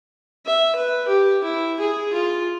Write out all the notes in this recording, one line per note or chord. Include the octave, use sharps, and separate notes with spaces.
E5
B4
G4
E4
G#4
F4